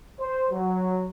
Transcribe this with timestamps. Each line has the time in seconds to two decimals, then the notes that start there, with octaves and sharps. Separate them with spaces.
0.20 C5
0.51 F#3